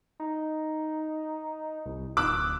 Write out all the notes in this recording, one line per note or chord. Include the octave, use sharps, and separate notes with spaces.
D#4
C2
D1 D6 E6 F#6